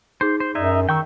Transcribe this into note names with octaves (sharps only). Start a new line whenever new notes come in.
D#4 G#4 C5
C5
F#2 D#4 D5 E5
D#3 G5 C#6 E6